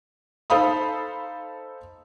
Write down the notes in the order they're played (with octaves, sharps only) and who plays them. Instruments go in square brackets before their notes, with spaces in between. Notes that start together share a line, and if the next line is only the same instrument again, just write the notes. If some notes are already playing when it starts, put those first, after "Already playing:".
[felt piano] D#4 A4 C5 F5 B5 D#6